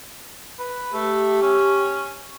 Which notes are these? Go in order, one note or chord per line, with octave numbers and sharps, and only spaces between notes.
B4
A3 G4
C#4